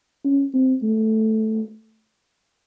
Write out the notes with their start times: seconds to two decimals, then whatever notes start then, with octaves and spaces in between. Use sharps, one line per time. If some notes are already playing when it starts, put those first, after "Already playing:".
0.25 C#4
0.54 C4
0.83 A3